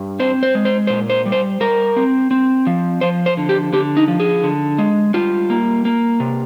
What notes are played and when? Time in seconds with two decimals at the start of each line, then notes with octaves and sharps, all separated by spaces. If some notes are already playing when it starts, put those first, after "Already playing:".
Already playing: G2
0.20 C4 C5
0.43 C5
0.55 G#3
0.65 C5
0.87 A#2 C5
1.10 C5
1.26 G3
1.32 C5
1.60 G3 A#4
1.96 C4
2.31 C4
2.67 F3
3.01 F3 C5
3.26 C5
3.37 D3
3.49 G4
3.73 D3 G4
3.97 D#4
4.08 F3
4.20 G#4
4.43 D3
4.78 G#3
5.14 G3 F4
5.50 A#3
5.85 A#3
6.20 C3